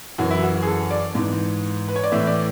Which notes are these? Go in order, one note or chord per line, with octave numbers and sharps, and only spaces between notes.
F#2 E3 F#4
E4
F#4
F#4
G#4
A4
D5
G#2 E3
B4
C#5
D5
A2 E3 E5
D5